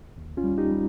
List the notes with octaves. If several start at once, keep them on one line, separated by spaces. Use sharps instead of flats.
D#2
C#4 F4
G3
D#4 G4
G3